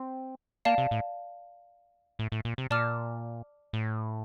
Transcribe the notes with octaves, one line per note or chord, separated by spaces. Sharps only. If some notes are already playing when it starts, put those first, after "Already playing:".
Already playing: C4
A#3 D5 F5 A5
C3
A2
A2
A2
A#2
C3
A#2 D5 A5 D6 F6
A2